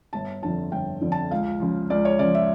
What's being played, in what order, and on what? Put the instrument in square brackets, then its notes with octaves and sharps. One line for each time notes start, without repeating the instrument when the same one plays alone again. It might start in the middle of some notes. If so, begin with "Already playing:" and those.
[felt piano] G1 A5
F2 D3 F3 A5
G1 G5
F2 D3 F3
A5
C#2 F5
C#3 F3
C#2 D5
C#5
C#3 F3 D5
E5